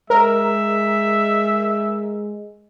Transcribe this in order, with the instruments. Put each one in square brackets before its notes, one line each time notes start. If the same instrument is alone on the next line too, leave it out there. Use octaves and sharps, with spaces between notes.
[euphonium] G#3 [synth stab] A#4 [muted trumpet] E5